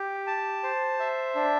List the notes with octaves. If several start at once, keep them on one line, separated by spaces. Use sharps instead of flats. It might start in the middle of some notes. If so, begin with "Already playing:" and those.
Already playing: G4
A5
C5
E5
D4